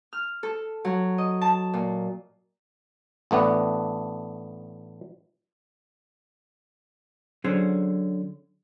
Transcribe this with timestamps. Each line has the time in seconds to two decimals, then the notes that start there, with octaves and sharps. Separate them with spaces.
0.13 F6
0.43 A4
0.85 F#3
1.18 D#5
1.41 A5
1.73 A#2
3.31 A1 A3 B3 D4
7.44 D3 F#3 C#4 G#4 C5